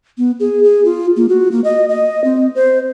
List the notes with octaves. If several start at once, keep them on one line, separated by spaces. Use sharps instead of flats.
B3
G#4
G#4
F4
A#3
F#4
A#3
D#5
D#5
C4
C5